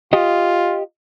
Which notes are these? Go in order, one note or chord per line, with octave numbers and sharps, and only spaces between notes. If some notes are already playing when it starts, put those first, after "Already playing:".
F4 G4 D#5